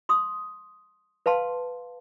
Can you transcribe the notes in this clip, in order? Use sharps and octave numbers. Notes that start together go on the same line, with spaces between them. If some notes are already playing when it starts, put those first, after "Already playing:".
C6 D#6
B4 F5 A5 C6